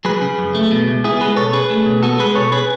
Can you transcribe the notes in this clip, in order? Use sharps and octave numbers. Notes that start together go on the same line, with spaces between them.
F#3 G#4 B4
C#3
F#2
A3
B2
C#2
B3 E4 G#4
G#3 G#4 B4
B2 A4 C#5
C#4 G#4 B4
A3
B2
B3 F#4 A4
G#3 G#4 B4
B2 A4 C#5
C#4 G#4 B4